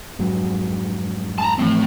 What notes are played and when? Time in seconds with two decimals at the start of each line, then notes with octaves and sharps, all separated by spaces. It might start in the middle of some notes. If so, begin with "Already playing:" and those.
0.19 F2 G#2 F#3
1.38 A5 A#5
1.58 A2 E3 F3 A3 C4